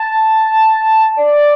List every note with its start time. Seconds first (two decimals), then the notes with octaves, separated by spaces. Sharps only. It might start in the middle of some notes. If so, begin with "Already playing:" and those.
Already playing: A5
1.17 D5